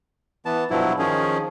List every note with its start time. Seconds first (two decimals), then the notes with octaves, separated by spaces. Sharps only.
0.45 E3 B3 A5
0.70 G2 B2 F3 F#3 E4
0.99 D#3 F3 C#4 G#4